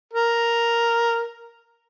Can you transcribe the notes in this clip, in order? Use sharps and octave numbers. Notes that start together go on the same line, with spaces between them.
A#4